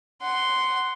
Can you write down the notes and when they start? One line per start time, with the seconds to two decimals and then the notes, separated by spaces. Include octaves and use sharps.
0.22 F#5 C6